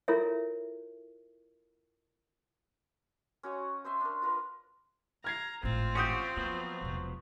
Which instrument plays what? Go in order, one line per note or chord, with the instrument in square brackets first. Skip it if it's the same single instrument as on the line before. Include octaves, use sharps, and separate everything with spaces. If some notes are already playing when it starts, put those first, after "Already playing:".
[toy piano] E4 F4 A4 A#4 C#5 E5
[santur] C#4 F#4 C#5 D#5
C5 D#5 E5 C6
D4 A#4
F4 A#4 B4
[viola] A#5 [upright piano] F6 G#6 C7
[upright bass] G#1 A2 [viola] C4 F4
[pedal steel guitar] C#4 F#4 G4 [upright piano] C#6 D#6 G6
[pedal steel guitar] F3 F#3 B3 [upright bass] A#3
[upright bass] E1 C3